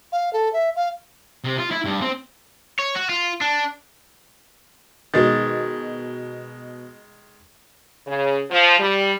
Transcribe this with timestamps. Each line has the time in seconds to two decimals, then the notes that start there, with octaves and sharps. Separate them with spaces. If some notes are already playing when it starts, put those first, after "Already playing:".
0.12 F5
0.33 A4
0.53 E5
0.76 F5
1.44 C3
1.58 F4
1.71 E4
1.85 G2
2.01 C4
2.80 C#5
2.96 F#4
3.09 F4
3.41 D4
5.14 B2 D#3 G#3 A6
8.06 C#3
8.51 F3
8.79 G3